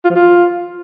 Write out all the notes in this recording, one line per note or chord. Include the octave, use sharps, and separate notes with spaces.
F4
F3
F4